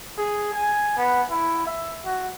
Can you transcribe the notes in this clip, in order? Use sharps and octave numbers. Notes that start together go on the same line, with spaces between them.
G#4
G#5
B3
E4
E5
F#4